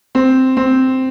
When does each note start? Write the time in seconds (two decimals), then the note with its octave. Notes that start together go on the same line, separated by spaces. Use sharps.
0.15 C4
0.57 C4